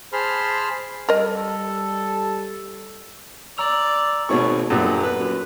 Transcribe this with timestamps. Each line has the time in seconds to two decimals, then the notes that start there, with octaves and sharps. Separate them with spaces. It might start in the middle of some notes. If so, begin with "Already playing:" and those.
0.13 G#4 C5 A5 B5 C6 F6
1.09 G3 A4 A#4 D#5
3.58 D5 A#5 E6 F7
4.29 G#1 B2 C#5 C#6
4.70 G1 F#2 A#2
5.04 B4
5.20 F#2